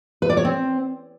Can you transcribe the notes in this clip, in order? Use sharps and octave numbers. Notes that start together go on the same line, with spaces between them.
B4
D5
C#5
C4